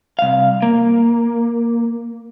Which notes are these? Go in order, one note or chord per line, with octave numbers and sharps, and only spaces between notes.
C2 F5
A#3